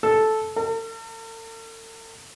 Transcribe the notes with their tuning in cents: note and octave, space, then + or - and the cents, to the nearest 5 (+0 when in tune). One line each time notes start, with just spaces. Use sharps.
A4 -10
A4 +45